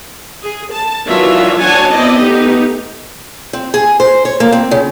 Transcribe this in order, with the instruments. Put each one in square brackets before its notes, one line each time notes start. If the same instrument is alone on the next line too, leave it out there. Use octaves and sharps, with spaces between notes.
[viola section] G#4
A5
D#3 E3 F#3 D4 F4 E5
F#3 D4 C#5 F#5 G#5 A5
B3 C4 E4 D5 D#5
A3 B3 D#4 G4
[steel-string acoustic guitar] C4
G#4
C5
C#5
A#3
C4
C#3